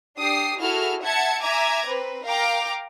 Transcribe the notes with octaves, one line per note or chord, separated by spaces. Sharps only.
D4 G4 D#6 C7
E4 F#4 G#4 A4 F6
E5 F#5 A5 G#6 C#7
E5 G#5 A#5 D6 G#6
C4 B4
A#4 F5 G5 A#5 D6